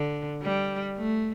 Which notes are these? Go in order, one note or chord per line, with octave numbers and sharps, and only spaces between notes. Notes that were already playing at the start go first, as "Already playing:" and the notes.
Already playing: D3
G3
A3